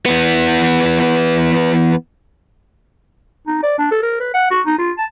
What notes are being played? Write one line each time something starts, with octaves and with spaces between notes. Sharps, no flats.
E3 B3
D#4
D5
D4
A4
A#4
B4
F#5
F#4
D#4
F4
A5